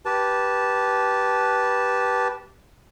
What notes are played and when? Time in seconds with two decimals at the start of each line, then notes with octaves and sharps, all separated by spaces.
0.06 G4 B4 A5